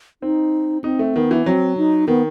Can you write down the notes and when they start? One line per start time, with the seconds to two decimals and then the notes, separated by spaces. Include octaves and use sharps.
0.22 C4 D#4
0.84 C4 D#4
0.99 A3
1.15 D#3 B3
1.31 E3
1.46 F#3 C4
1.77 D#4
2.08 D#3 B3